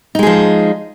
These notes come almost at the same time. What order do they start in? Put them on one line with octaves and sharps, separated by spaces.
D#4 G#3 G#4 F3